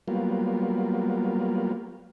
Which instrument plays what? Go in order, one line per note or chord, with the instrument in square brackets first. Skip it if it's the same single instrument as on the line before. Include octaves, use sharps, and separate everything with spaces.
[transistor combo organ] F#3 G3 A#3 B3 F4